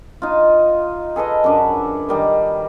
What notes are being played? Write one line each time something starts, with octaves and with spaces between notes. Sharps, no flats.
D#4 F4
G#4 A4 B4 D#5
F#2 D4 E5
D#3 G3 D#4